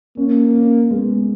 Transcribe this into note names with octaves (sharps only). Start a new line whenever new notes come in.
A#3 C#4
C#4
G#3 B3